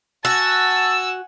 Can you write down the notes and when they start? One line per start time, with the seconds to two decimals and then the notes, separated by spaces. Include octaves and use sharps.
0.25 F#4 F#5 G#5 A5 E6